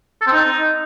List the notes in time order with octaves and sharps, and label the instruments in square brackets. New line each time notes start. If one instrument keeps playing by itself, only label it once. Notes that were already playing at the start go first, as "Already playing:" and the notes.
[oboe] A4
C4
D#4